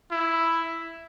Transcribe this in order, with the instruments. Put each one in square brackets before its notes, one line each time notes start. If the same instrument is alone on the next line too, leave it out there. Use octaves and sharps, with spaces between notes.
[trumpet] E4